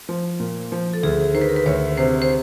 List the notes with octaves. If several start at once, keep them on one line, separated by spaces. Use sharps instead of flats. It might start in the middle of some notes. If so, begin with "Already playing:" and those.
F3
A#2
F3
A4
D2 G#4
D#3 C5
B4
A#4
B4
D2 C#5
C3 C5
C5